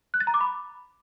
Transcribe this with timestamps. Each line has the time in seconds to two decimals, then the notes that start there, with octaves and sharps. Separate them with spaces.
0.14 F#6
0.20 A6
0.27 A#5
0.34 D6
0.41 B5